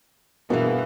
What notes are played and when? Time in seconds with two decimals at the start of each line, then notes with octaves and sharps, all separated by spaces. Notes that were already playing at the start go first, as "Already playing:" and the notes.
0.50 G2 B2 E3 A#3 B3 F#4 G#4 F5